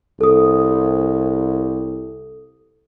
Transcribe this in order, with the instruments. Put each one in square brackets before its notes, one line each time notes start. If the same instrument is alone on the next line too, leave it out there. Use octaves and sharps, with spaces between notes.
[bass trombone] C2 [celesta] A4 D#6